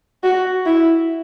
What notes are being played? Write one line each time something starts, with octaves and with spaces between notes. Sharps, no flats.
F#4
E4